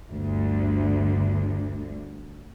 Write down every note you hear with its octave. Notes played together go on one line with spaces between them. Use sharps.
G1 D2 D3